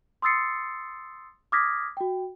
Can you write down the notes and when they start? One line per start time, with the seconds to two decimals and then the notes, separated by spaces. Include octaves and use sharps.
0.22 C6 D#6 E6 A6 C7 C#7
1.52 D6 D#6 F6 G#6 A#6 B6
1.97 F#4 G5